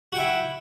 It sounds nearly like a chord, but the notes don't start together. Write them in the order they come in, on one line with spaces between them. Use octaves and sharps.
F#4 G5 E4